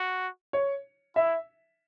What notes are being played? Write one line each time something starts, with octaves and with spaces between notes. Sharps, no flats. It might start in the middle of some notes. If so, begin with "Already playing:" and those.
Already playing: F#4
C#5
E4 E5